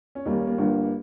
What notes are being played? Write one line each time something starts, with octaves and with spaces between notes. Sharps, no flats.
C#4
D#2 D#3 G3 A#3 D#4
C#4
A#3
G1 G2 G3 A#3